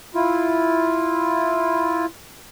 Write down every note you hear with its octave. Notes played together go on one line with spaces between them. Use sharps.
E4 F4